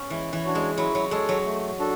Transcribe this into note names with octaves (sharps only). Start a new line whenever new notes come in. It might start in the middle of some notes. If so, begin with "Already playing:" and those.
Already playing: B3 C#4
E3 G#3
E3
D4 F#4 C#5
G#3
F#3 E4
F#3
G#3 A4 C#5
F#3
A3
D4 F#4 A4